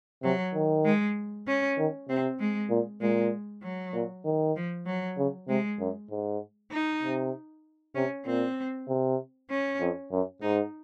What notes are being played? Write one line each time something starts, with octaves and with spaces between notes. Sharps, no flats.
C3 F#3
D#3
G#3
C#4
D#3
C3 C4
G#3
A#2
A#2 G#3
F#3
A#2
D#3
F3
F#3
C#3
C3 G#3
F#2
G#2
D#4
C3
C3 C#4
A#2 C4
C3
C#4
F2
F#2
G#2 D#4